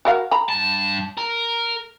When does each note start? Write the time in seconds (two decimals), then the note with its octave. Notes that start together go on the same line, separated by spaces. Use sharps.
0.05 F#4 A#4 F5
0.31 A#5 B5
0.49 G2 A5
1.18 A#4